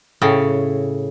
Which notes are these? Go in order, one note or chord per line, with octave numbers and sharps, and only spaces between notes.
A2 C#3